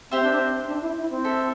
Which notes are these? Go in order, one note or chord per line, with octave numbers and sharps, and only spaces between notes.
C4 G4 C5 E5 G5
D4
C4
D4
E4
E4
C4
A4 C5 E5